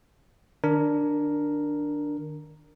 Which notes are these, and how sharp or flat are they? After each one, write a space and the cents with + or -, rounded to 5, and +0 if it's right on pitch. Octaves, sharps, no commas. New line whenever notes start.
D#3 -40 D4 +0 A#4 +0